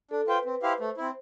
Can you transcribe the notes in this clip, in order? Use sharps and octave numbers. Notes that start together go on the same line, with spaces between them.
D4 A4
F4 B4 C5 G5
C4
E4 G4 C5 F5
A3 C5
C4 E4